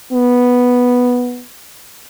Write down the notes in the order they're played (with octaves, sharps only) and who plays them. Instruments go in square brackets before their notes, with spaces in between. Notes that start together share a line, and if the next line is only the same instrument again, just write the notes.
[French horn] B3